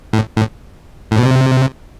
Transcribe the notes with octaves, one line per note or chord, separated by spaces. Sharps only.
A2
A2
A2
B2
C3